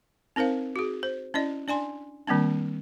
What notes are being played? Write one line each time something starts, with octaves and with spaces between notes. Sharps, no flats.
C4 D#4 A#4 C5 F5
F#4 G#4
C5
C#4 E4 D5 D#5
D4 D5 G#5 C6
D#3 G3 A#3 C4 D4